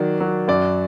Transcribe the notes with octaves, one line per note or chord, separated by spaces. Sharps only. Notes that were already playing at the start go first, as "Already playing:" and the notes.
Already playing: D#3 F#3 D5
F#3
F#2 D5